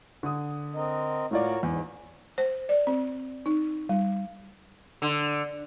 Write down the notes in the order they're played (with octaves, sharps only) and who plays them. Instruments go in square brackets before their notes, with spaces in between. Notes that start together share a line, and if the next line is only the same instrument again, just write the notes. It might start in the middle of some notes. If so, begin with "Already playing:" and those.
[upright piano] D3 D#6
[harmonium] C4 A#4 D#5
[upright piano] A2 F4 D5 [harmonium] F#4 A#4 C#5
[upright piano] E2 [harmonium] G#2
[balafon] C5
D5
C4
D#4
G3
[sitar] D3